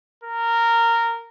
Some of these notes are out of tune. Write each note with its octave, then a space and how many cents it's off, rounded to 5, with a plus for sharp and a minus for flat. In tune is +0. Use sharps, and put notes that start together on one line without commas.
A#4 -10